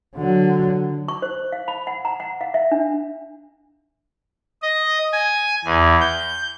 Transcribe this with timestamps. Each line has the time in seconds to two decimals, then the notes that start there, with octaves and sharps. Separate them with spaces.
0.16 D3 F#3
1.08 C#6
1.22 C5
1.52 F5
1.68 B5
1.87 F#5
2.05 A#5
2.20 F#5
2.41 F5
2.54 E5
2.71 D4
4.62 D#5
5.13 G#5
5.65 E2
6.01 G6